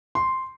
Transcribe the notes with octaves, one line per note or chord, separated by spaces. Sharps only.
C6